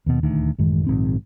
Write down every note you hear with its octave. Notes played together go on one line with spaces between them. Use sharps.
D#2 B2
D#1 D2 D#3
A1 F#2 D#3 G#3
A#1 G#2 D#3 C4